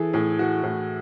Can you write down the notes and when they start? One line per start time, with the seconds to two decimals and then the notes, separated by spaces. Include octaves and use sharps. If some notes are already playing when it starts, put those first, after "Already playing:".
Already playing: E3 G#4 A4
0.13 A2 G#4
0.39 E3 F#4
0.64 A2